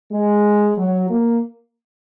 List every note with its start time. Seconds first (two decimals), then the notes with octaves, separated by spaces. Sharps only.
0.12 G#3
0.77 F#3
1.10 A#3